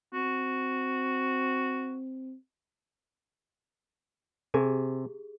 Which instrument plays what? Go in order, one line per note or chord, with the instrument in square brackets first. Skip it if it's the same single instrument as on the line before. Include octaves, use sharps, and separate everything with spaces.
[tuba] C4 [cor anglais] F#4
[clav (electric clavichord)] C3 G#5 [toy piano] G4 G#4